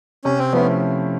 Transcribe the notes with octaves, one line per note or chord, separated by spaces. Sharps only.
C3 C#4
C4
F3 A3 B3 C#4 E4